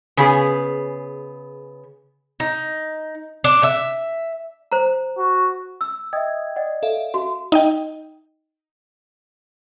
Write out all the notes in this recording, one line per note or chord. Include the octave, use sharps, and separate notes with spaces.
C#3 B3 G#4
D#4
D4
E5
C5 A#5
F#4
E6
D#5 E5 G5 D#6 G#6
D5 D#5 F#5
A4 E5 F5
F#4
D#4 D#5 G5